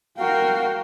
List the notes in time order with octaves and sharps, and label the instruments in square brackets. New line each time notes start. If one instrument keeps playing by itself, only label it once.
[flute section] F#4 F5 [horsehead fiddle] A#4 G5